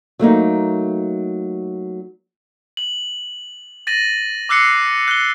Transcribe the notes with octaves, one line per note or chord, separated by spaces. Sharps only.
F#3 A3 A#3 D#4
F#7
A6 A#6 D#7 F#7
D6 E6 F#6 C7 C#7
F#6 G7